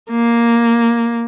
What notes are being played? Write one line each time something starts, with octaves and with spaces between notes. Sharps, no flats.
A#3